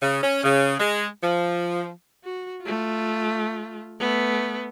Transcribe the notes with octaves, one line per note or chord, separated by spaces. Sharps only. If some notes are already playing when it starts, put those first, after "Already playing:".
C#3
C#4
C#3
G#3
F3
F#4
A3 F4
A3 B3